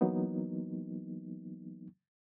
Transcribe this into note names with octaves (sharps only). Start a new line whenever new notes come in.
E3 F#3 A#3 B3 D#4